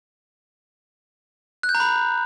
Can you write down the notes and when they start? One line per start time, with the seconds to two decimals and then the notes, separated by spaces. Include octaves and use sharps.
1.63 F#6
1.69 G6
1.75 A#5
1.80 B5